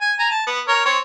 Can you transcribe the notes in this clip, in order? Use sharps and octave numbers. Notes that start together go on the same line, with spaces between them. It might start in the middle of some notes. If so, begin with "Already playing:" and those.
G#5
G#5 A#5
A5
B3
A#4 C#5
C4 C#5